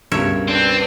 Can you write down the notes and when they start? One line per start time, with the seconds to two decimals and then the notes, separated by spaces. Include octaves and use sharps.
0.12 C#2 G2 B2 A#4 C#5 E5
0.48 C4 D4 B4 G5